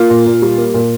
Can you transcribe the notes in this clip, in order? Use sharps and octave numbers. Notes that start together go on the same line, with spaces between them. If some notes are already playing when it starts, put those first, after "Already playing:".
Already playing: A#3 F4
A#2
A#2
G3
A#3
A#2